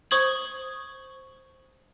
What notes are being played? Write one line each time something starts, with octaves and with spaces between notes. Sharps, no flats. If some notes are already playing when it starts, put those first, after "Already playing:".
C5 C#6 D#6 G#6 F#7